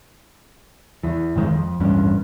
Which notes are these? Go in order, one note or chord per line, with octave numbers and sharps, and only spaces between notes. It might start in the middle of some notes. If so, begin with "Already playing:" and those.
E2 E3
G#1 F#2 D#3 G#3
F2
D#1 A1 G2 C#4